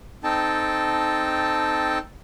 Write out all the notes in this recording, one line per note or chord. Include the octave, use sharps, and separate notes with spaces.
C4 D#4 A4 G5 A5